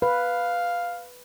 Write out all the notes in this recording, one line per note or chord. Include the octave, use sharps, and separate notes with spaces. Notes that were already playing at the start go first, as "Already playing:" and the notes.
B4 F5